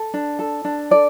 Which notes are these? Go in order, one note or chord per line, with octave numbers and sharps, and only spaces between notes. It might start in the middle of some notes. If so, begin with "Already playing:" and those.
Already playing: A4
D4
A4
D4
A4 D5